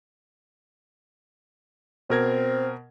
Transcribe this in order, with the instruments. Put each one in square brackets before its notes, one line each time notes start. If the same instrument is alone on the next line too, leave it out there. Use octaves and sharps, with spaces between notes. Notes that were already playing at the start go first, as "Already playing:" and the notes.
[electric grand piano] B2 A#4 G#6 [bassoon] C4